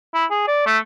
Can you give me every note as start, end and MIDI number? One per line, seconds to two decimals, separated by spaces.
0.14 0.25 64
0.30 0.45 68
0.47 0.64 74
0.67 0.78 57